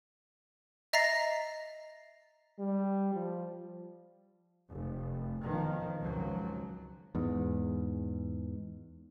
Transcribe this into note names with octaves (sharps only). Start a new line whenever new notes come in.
D#5 E5 A#5 A6 A#6 C7
G3
F3
F1
B2 D#3 F3
G#1 C#2 F3 F#3
E2 G#2